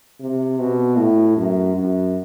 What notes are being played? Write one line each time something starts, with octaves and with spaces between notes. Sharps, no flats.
C3
B2
A2
F#2
F#2